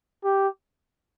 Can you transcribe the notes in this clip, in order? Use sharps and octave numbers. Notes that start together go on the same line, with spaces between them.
G4